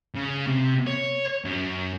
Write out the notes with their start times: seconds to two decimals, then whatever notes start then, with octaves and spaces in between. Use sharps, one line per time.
0.15 C#3
0.47 C3
0.87 C#5
1.45 F#2